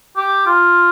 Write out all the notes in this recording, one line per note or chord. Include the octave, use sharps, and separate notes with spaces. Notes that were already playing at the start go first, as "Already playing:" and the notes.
G4
F4